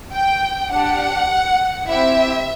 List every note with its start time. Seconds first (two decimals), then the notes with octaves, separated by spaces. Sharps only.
0.13 G5
0.71 D4 G4 F#5
1.88 C4 E4 G4 E5